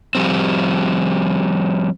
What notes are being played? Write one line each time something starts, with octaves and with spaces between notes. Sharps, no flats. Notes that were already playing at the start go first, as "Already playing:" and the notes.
F3 G3 C4